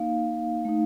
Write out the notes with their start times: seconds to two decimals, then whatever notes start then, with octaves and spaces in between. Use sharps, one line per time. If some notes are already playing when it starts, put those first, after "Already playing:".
Already playing: A#3 D#4 F5
0.65 A3 D#4